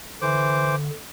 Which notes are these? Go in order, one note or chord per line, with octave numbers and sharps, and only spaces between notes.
D3 E3 C5 D6